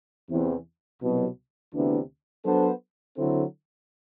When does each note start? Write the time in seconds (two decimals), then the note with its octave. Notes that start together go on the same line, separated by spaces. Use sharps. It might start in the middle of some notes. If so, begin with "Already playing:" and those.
0.29 E2 C3 E3
1.01 C2 B2 F#3
1.74 D2 C3 E3 B3 D4
2.45 F#3 B3 D4 A4 C5
3.18 D3 F#3 C4 E4 A4